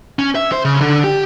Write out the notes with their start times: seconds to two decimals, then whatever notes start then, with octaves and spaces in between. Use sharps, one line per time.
0.19 C#4
0.35 E5
0.52 C5
0.65 C#3
0.81 D3
1.04 G4